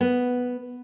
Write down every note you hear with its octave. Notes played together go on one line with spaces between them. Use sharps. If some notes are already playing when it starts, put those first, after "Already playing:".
B3